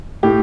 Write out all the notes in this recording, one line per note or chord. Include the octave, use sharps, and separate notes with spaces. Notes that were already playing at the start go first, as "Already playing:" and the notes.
A2 G4